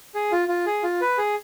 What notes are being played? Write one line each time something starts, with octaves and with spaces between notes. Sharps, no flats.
G#4
F4
F4
G#4
F4
B4
G#4